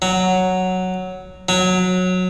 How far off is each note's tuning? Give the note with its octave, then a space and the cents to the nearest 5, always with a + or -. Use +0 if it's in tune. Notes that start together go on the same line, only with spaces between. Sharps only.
F#3 +0
F#3 -15